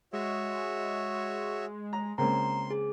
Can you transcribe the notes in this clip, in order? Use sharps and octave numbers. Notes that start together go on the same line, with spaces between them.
G#3 F#4 C#5 E5
A#5
C#2 A#3 C4 A#5 C6
G#4